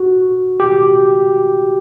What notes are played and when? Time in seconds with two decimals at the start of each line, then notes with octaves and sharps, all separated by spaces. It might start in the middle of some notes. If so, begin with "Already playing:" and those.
Already playing: F#4
0.60 G4